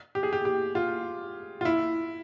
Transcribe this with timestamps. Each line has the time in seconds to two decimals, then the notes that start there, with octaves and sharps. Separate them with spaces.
0.15 G4
0.23 G#4
0.33 G4
0.45 G4
0.75 F4
1.61 F4
1.65 E4